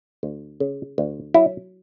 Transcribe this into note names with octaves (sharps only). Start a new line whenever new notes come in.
D2
C#3
D2
F#3 E4